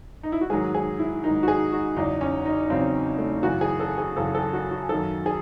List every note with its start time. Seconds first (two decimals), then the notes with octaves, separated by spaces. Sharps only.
0.23 D#4
0.32 E4
0.41 F#4
0.50 G#2 D#3 F#3 G#4
0.75 G#4
0.99 E4
1.23 G#2 D#3 F#3 D#4
1.43 F#4
1.48 G#4
1.72 F#4
1.96 E2 C#3 F#3 D#4
2.21 C#4
2.46 D#4
2.70 E2 C#3 F#3 C4
3.18 A3
3.43 F#2 C#3 E3 F#4
3.61 G#4
3.80 A4
3.98 G#4
4.16 F#2 C#3 E3 A4
4.35 A4
4.53 F#4
4.71 F#4
4.89 F#2 D#3 F#3 A4
5.26 G#4